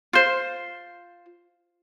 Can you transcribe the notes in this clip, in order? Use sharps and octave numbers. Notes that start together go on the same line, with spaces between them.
F4 C5